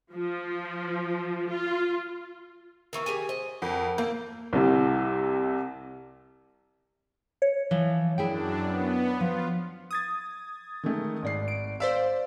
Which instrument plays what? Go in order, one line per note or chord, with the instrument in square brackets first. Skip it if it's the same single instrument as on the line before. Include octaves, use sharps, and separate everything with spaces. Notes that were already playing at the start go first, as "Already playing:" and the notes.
[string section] F3
F4
[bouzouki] D#3 E3 A#3 [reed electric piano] A#4 C#6
[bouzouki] G4 G#4 G#5
[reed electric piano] C5 [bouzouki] D#5
[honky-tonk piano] F2 [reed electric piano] A#4 F#5
[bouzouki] E3 [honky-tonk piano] A#3 [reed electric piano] G6
[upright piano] C2 C3
[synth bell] C#5
[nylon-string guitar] E3 F3
[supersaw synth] F#2 D4 [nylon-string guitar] E4 G#4 G5
[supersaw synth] B3
[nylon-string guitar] F3 [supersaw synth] F4
[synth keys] D#6 G#6 A6
[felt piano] D#3 G#3 A3
G#1 D5 C7
[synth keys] D7
[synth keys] C5 D5 F5 [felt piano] E6 B6